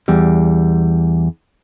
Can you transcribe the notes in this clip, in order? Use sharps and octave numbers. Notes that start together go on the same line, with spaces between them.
E2 G3